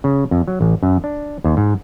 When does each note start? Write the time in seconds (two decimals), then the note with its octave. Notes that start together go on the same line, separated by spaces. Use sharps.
0.04 C#3
0.31 F2
0.48 F#3
0.61 A1
0.83 F#2
1.04 D4
1.44 D#2
1.57 G#2